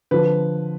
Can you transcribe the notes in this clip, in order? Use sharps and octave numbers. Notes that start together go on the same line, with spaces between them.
D3 F3 B4